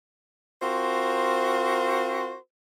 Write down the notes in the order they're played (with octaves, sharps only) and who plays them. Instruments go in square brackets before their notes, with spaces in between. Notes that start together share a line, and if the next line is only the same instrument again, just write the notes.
[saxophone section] C4 F4 F#4 A#4 C5